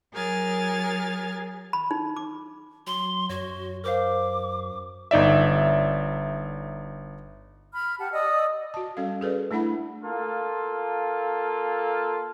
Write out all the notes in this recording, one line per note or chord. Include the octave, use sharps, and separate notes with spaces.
F#3 G#4 A#4 G#5 F6 A6
B5
D#4
D6
F#3 C6
F#2 F#4 C#5
A#4 C5 F5 D6
G1 D#4 D5 E5
B5 F6
G4 F#5 A5
D5 D#5 D#6 E6
F#4 A5
G3 C#4 A4 F5
G#4 A4 B4 D5
A3 D4 E4 F#5 B5
A#3 F4 A4